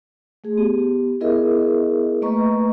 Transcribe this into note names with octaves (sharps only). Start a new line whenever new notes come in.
A3 G#4
B3 G4
B3 E4 G#4 A#4 D#5 E5
A3 A#3 B4 D#5 A#5 C#6